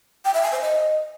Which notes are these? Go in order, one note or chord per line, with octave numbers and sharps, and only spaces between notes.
G5
E5
G#5
C5
D#5